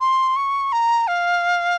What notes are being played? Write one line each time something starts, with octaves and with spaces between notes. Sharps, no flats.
C6
C#6
A#5
F5